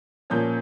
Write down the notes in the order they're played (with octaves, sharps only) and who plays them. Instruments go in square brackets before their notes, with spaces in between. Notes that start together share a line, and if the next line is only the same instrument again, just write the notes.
[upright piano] A#2 F3 A#3 C#4 G6